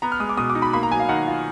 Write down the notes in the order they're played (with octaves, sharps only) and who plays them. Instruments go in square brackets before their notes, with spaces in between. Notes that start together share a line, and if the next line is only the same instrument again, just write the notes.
[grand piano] B3 A#5
F6
G#3 D#6
D6
B2 D#6
D6
D#4
B5
A#3 B5
A#5
F#3 G#5
F5
D#3 F#5
F4